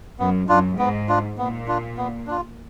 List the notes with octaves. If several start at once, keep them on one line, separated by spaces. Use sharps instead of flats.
F#2 B3
F#2 D4 F4
G#2 B3
D4 F4
A#2 B3
D4 F4
B3
D4 F4